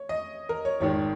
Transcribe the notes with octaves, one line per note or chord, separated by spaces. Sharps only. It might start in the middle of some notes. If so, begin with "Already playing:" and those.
Already playing: C#5
D#5
A#4
C#5
G#1 G#2 D#3 C#5